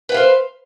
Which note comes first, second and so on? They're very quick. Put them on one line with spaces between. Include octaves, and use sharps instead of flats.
B4 F#5 F5 C5